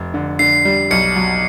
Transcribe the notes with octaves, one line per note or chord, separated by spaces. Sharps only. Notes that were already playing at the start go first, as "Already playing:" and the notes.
Already playing: F1
D3
D3 C7
G3
B1 C#7
F#3